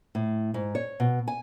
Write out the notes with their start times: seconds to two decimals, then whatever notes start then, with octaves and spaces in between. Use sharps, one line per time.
0.15 A2
0.54 G#2
0.75 C#5
1.00 B2
1.27 G#5